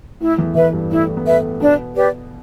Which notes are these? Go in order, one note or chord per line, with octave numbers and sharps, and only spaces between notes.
A2 A3 E4
E2 E3
E2 E3 B4 E5
G2 G3
A2 A3 E4
B3
A2 A3 B4 E5
B2 B3 D4
G4 B4 D5